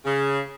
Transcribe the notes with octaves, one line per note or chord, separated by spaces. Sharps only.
C#3